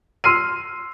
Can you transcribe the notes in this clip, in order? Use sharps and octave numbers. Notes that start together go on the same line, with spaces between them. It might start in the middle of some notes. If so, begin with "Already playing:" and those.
C6 E6 F6 C7 D#7